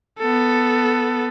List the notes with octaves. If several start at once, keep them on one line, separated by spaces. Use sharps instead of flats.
B3 A4